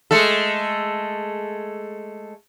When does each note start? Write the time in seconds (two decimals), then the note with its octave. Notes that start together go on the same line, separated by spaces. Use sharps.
0.11 G#3 A3 A4